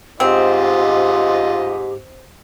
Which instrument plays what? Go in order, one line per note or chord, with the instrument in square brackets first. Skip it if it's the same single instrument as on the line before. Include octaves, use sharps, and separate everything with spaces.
[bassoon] G#2 [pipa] C4 [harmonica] F4 D#5 [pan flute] G4